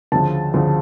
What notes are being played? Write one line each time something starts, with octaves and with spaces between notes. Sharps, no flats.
D2 C#3 F3 A5
D2 C#3 F3